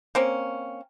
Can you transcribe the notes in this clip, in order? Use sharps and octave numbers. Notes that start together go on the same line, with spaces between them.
A#3 C4 C#4